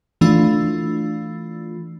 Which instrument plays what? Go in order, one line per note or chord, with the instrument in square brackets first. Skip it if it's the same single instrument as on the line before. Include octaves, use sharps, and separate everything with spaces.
[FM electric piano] E3 A3 D4 F4